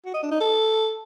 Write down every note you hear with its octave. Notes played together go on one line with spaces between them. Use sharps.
F#4
D#5
D4
D#4
A4